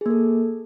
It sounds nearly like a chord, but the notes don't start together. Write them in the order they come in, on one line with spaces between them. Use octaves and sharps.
G#4 A#3 A4